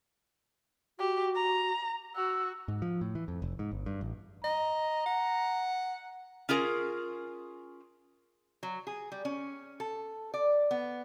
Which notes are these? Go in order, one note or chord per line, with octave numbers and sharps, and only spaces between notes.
F#4 G4
A#5
F#4 E6
G#2
F3
A2
E3
F2
F1
G#2
G1
G2
A1
D#5 A#5
F#5
C#4 F4 G#4 A#4
F#3
G#4
G3
C#4
A4
D5
B3